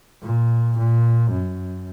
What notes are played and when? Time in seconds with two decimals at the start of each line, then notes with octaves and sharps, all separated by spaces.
0.23 A#2
0.78 A#2
1.32 F#2